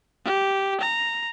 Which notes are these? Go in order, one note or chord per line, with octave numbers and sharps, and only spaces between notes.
G4
A#5